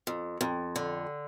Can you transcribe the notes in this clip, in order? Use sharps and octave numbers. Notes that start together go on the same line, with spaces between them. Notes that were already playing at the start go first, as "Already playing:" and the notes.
F2
F2
D3